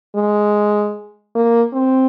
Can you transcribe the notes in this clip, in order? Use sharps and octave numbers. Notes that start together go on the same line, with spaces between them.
G#3
A#3
C4